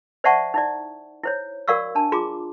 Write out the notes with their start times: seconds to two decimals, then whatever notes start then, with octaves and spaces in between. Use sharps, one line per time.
0.24 C5 D5 E5 F#5 A5 C#6
0.54 D#4 E4 D5
1.23 E4 C5 C#5
1.68 F#4 A#4 D5 F5 C#6 E6
1.95 D4 A5
2.12 F4 G#4 A#5 C6 D6